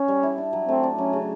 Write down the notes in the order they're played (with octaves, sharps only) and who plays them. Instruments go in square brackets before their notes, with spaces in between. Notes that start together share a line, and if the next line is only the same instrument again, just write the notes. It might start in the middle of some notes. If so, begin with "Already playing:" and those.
Already playing: [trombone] C#4
[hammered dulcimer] G3
E4
D4
F#3
[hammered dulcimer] A3 [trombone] C4
[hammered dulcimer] D4
[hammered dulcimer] F#3 [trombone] C#4
[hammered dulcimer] C#3